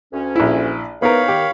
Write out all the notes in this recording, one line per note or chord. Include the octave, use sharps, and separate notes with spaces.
D2 C#4
A#1 E4
G#2 E3 B3 D#4 A#4 C#5 F5 B5
D#3 G4